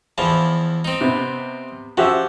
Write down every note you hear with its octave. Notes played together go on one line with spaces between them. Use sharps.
E2 E3 F3
C4 D#4
C3 B3
F3 F#4 G4 E5